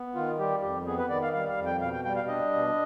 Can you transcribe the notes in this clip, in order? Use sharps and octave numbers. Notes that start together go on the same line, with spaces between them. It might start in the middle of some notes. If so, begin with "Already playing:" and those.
Already playing: B3
D#3 F4
G3 G4
F2 G4
B3 G#4
B4
D#3 D5
F5
G3 F5
F5
F2
G5
B2 F5
G5
G3 G5
F5
D4 D#5
B2